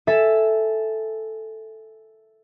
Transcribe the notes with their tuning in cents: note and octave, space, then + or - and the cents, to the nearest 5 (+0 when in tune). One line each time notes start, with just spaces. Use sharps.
A4 +0 E5 +0 G#5 +0